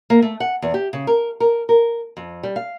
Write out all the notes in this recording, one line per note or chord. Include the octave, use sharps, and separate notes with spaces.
A#3
A3
F#5
E2
G4
C#3
A#4
A#4
A#4
F2
G3
F5